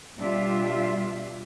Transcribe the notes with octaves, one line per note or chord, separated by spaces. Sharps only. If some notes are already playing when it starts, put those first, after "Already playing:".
B2 G3 D4 F4 G4 E5